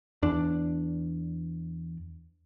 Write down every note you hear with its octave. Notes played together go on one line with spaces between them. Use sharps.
E2 D4